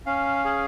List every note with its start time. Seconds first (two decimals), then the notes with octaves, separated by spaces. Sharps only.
0.06 C#4 F5
0.45 G#4